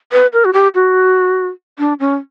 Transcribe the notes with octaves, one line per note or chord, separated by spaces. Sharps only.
B4
A#4
F#4
G4
F#4
D4
C#4